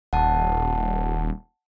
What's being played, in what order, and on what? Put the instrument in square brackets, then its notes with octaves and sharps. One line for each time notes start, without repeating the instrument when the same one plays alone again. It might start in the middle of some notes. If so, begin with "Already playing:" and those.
[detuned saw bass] D#1 [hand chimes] F#5 A5